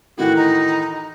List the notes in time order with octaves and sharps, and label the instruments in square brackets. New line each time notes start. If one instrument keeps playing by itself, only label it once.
[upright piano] A2 D#3 E3 [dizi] F#4
[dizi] D#4